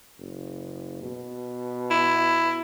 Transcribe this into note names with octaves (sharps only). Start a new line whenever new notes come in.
F#1
B2
E4